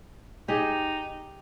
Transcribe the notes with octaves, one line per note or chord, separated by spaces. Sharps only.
D#4 G4 G#4